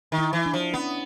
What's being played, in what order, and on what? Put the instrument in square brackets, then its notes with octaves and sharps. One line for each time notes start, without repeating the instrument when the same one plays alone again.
[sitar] D#3
[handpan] E4
[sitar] E3
[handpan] D4
[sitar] F3
[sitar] B3 [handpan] C#4